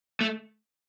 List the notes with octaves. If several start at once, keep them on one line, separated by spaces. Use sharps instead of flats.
A3